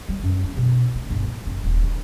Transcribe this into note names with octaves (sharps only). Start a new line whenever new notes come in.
G3
F#2
C#4
B2
A#3
G1
A2
F#1
D#1
D3